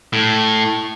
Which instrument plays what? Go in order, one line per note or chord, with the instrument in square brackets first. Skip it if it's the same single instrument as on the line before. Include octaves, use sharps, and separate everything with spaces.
[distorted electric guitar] A2